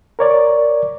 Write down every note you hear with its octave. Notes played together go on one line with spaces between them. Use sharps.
A#4 C#5 D5